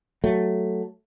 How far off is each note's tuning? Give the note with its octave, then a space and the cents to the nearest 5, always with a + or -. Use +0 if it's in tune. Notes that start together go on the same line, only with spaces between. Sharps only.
F#3 +5 A3 +0